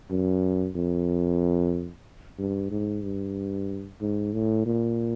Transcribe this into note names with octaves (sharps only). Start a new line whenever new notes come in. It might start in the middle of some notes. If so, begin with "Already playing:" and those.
F#2
F2
G2
G#2
G2
G#2
A2
A#2